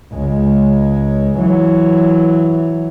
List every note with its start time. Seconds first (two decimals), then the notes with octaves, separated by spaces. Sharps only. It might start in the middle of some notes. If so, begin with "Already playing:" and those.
0.14 C#2 G#3
1.39 E3 F#3